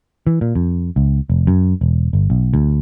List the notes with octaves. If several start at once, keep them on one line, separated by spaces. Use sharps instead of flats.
E3
A#2
F2
C#2
F1
F#2
E1
G1
B1
D2